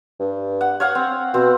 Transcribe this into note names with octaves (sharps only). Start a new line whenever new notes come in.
G2
F#5
C#5 F5 F#5
C4
B2 C4